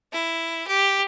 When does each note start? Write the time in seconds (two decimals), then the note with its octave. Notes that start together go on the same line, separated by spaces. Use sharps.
0.12 E4
0.68 G4